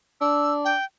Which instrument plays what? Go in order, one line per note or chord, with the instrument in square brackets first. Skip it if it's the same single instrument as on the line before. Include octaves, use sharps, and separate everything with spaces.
[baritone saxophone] D4 [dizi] E6
[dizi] G5